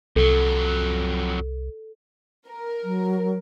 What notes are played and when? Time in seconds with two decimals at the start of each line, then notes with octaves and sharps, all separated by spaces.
0.16 C2 F2 F#3 A4
2.48 A#4
2.84 F#3